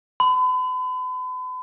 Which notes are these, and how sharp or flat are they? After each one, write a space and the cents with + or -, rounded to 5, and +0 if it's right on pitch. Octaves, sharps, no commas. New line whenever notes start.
B5 +40